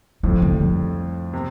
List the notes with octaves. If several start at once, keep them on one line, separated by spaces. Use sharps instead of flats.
F2 A2 F3
D3
G3
C3